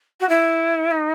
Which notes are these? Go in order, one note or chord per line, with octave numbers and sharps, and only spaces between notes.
F#4
E4
D#4